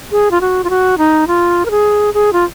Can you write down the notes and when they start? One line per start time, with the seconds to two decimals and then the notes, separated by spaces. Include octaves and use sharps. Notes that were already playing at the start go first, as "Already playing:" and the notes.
0.12 G#4
0.31 F4
0.41 F#4
0.64 F4
0.70 F#4
0.98 D#4
1.27 F4
1.66 A#4
1.71 G#4
2.14 G#4
2.33 F4